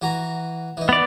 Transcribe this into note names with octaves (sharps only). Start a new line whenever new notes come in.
E3 F#4 A#5
E3 D#4
B3 D5